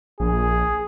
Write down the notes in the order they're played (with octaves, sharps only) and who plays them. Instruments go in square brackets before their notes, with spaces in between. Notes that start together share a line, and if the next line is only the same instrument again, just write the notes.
[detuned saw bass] A#1 [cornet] G#4